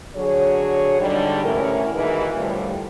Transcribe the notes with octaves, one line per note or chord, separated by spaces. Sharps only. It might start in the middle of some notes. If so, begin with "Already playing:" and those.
D3 F#3 G#4 C#5
G#2 D3 G3
D2 A2 E3 C#4 A#4
D#2 G#2 B2 E3 A#4 B4
D2 A2 F3 G3